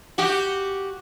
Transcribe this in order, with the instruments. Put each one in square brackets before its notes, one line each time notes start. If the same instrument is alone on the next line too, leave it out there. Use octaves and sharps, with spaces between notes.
[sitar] F#4 G4